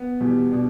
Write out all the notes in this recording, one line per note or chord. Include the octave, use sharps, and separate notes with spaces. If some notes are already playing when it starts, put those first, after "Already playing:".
Already playing: B3
E2 B2 G3
B2 G3 D4